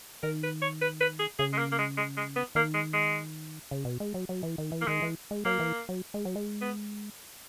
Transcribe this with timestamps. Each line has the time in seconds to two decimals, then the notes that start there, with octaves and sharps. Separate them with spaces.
0.23 D#3 A#4
0.43 B4
0.62 C#5
0.81 B4
1.01 B4
1.19 G#4
1.39 C#3 G#4
1.53 G#3
1.58 A#3
1.72 A#3
1.79 G#3
1.97 G#3
2.17 G#3
2.36 B3
2.55 D#3 A#3
2.74 G#3
2.93 G#3
3.71 C#3
3.85 B2
4.00 G#3
4.14 F#3
4.29 F#3
4.43 E3
4.58 D#3
4.72 E3
4.81 A#3
4.87 D#3 G#3
5.02 E3
5.31 G#3
5.45 F#3 A#3
5.60 E3
5.89 F#3
6.14 G#3
6.25 F#3
6.36 G#3
6.61 B3